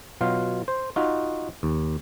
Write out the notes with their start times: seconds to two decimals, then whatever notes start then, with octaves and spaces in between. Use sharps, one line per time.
0.21 B2 F#3 F4 F5
0.68 C5
0.96 D#4 F4 F#4
1.63 D#2